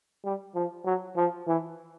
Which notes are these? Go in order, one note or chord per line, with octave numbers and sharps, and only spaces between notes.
G3
F3
F#3
F3
E3